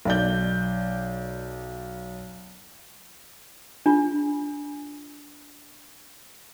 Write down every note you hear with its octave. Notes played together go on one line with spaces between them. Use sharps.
B1 D5 G6
D4 F4